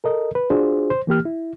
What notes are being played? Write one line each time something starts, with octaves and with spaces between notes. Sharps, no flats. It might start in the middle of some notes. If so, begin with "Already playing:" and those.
A4 A#4 D#5
B4
D4 F4 F#4 G#4 C5
C5
E3 A#3 G4 F6
E4